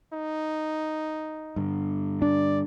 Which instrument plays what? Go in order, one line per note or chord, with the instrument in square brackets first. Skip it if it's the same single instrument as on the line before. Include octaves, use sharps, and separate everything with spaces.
[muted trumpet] D#4
[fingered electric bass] G2 D3
[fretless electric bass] D4 [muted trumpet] D5